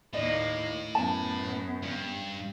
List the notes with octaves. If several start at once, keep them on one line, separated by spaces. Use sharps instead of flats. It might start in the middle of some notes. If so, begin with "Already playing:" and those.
D#2 A2 A#3 D5 D#5
F#2 B3 A5
G2